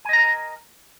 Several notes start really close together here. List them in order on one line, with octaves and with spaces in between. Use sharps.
G#5 D#5 A#5 A#4